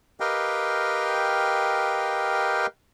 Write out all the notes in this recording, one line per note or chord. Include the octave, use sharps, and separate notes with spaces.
G4 A#4 B4 D#5 F5 G5